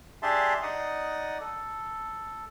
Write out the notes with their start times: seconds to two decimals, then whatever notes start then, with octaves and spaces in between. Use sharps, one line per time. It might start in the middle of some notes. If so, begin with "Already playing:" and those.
0.23 D4 G4 G#4 E5 A5 C6
0.63 D#4 D5 D#5 F#5 D#6
1.40 A4